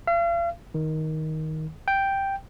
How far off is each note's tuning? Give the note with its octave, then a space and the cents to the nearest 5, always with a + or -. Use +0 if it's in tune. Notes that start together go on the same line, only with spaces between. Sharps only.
F5 -40
D#3 +10
G5 +0